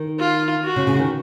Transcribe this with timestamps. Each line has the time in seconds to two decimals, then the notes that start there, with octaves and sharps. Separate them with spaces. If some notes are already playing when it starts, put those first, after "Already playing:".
Already playing: D#3
0.19 F4
0.64 F#4
0.76 C#3
0.87 C#3
0.99 D#3